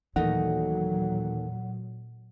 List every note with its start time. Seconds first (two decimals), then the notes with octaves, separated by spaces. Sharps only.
0.16 D#2 A#2 E3 F#3 A3 D#4 F#5